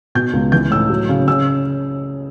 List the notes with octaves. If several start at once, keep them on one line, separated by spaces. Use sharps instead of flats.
B2 G6
C#2
E3 G6
A2 E6
F#3
C#3
C#3 E6